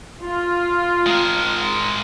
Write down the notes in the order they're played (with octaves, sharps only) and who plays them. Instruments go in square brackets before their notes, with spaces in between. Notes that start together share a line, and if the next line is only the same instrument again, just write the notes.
[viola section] F4
[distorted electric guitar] G#3 A#4